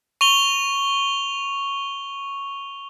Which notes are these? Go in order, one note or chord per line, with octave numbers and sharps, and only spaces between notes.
C#6 F7 G7